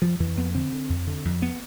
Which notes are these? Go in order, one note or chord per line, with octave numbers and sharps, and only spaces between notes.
F2 F3
F2 E3
F2 B3
D3 C4
D3
F2
D3
F2
B3